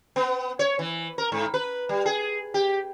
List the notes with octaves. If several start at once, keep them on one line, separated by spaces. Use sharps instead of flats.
B3
C#5
E3
A#4
G#2
B4
G3
G#4
G4